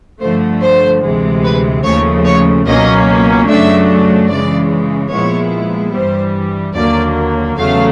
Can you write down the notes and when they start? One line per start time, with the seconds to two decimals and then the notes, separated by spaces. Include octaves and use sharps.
0.20 G2 D3 F3 A3 C5
0.61 C5
1.01 D2 C3 E3 G#3
1.43 B4
1.83 D#2 C#3 F3 A3 C#5
2.24 C#5
2.66 C#2 B2 F#3 A#3 C#4 D#5
3.47 F#2 C#3 F#3 A3 D4 E5
4.29 C#3 E3 G#3 D5
5.11 A#2 F3 G#3 B3 E4 C#5
5.92 G2 E3 G3 C5
6.75 D#2 D3 F#3 A#3 D5
7.57 E2 C#3 F#3 A3 F5